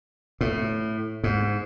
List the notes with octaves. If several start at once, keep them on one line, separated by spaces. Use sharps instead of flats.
A2
G#2